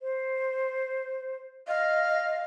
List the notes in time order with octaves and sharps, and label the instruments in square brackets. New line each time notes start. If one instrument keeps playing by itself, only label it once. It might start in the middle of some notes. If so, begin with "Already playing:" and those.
[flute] C5
[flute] D#5 [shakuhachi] F5